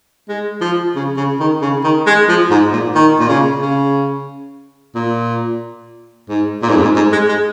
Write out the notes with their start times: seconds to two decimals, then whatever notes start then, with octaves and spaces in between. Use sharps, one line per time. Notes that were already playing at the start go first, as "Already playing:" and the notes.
0.29 G#3
0.61 F3
0.96 C#3
1.17 C#3
1.40 D#3
1.61 C#3
1.84 D#3
2.06 G#3
2.28 F3
2.51 G#2
2.72 A#2
2.95 D#3
3.19 A#2
3.29 C#3
3.62 C#3
4.95 A#2
6.29 G#2
6.62 A#2
6.69 G#2
6.76 F2
6.82 G#2
6.96 G#2
7.12 G#3
7.29 G#3